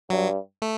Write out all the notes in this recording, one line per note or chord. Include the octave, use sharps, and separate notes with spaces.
G2 F#3
A3